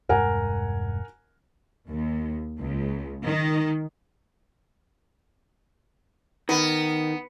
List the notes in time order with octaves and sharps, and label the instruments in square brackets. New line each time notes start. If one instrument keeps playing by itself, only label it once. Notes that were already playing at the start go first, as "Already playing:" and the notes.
[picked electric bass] E1 G2 G#3 [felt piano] A#4 F#5 G#5
[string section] D#2
C#2
D#3
[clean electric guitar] D#3 [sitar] B3